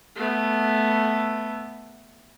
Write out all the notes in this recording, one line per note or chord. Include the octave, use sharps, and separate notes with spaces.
A3 B3